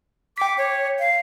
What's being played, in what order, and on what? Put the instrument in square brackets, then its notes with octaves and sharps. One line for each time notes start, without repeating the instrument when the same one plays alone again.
[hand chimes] G5 B6 [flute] D6
[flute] C#5
F5